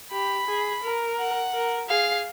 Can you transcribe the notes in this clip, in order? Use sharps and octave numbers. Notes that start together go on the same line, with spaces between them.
G4 B5
G#4
A#4
F#5
A#4
G#4 F5